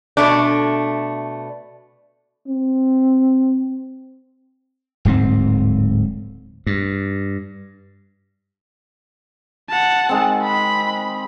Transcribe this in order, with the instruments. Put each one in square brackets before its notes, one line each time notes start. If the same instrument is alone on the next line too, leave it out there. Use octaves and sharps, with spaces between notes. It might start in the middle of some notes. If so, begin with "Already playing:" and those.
[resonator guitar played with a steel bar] B2 A3 D4
[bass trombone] C4
[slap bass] D1 G#2 A#3 C4
G2
[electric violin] F#5 A5
[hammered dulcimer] D#3 G#3 C4
[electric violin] B5